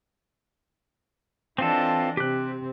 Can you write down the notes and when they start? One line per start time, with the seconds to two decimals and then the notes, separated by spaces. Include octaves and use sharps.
1.58 E3 C4 D4 F4 A4 D#5
2.17 C3 C4 G4 F#6